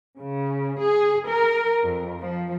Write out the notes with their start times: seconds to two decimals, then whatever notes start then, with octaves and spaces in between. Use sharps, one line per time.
0.17 C#3
0.80 G#4
1.27 A#4
1.83 F2
2.19 F3